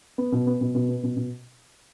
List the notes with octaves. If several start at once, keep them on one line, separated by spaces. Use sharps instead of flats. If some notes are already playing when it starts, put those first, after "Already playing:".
B3
B2
B3
B2
B2
B3
B2
B2